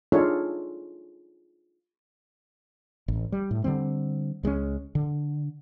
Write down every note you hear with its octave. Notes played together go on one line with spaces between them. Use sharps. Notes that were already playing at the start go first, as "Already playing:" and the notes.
D4 D#4 F4 G#4 A4 C#5
A1
G3
A2
D3 D#3 G3 C4
C#2 G#3 C4 C#4
D3